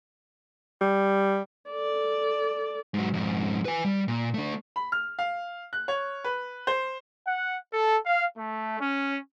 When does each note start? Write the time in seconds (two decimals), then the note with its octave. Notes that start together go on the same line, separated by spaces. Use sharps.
0.81 G3
1.70 A4 D5
2.94 G#2 F#3
3.14 F2 G#2
3.65 B4 G#5
3.84 G3
4.08 A#2
4.34 A3 D4
4.76 B5
4.92 F6
5.19 F5
5.73 F#6
5.88 C#5
6.24 B4
6.67 C5
7.28 F#5
7.73 A4
8.05 F5
8.38 A3
8.80 C#4